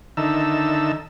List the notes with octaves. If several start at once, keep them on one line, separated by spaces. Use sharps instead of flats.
D3 D#3 D#4 E5 A5 E6